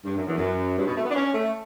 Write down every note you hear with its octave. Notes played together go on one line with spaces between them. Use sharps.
G2
F#2
E2
F#2
G2
B2
A3
B3
D4
C#4
A3